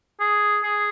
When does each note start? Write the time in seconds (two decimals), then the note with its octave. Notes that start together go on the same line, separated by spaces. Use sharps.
0.20 G#4
0.63 G#4